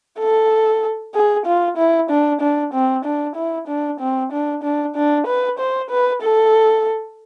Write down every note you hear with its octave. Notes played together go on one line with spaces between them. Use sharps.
A4
G#4
F4
E4
D4
D4
C4
D4
E4
D4
C4
D4
D4
D4
B4
C5
B4
A4